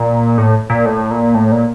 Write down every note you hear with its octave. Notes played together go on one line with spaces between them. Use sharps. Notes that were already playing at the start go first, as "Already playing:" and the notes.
Already playing: A#2
A2
A#2
A2
A#2
A2
A#2